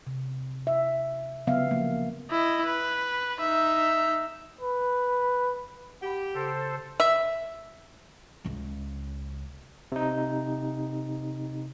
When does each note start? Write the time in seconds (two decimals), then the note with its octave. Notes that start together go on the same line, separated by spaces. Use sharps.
0.07 C3
0.67 E5
1.47 C#3 F#3 B3 E5 F5
1.67 F3 A#3
2.31 E4 D#5
2.66 B4
3.40 D#4 E5
4.61 B4
6.01 G4 F#5 B5
6.35 C#3 A4 C5
7.00 E5
8.45 C#2 C#3
9.92 C3 D#4